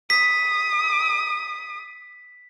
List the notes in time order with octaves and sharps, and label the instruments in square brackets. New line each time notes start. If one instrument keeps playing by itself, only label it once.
[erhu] D#6 [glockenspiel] B6